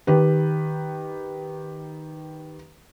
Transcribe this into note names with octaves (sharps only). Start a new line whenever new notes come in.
D#3 G4 B4